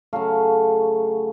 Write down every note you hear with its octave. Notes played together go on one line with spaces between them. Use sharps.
C#3 F#3 A3 F5